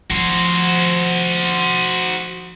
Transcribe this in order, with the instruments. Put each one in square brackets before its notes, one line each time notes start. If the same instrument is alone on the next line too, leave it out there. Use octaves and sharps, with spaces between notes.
[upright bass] F3 [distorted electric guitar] F#4 C5